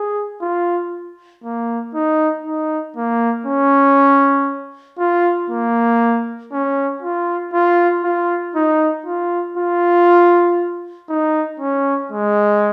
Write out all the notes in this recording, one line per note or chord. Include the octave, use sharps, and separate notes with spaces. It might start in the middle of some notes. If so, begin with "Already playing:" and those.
Already playing: G#4
F4
A#3
D#4
D#4
A#3
C#4
F4
A#3
C#4
F4
F4
F4
D#4
F4
F4
D#4
C#4
G#3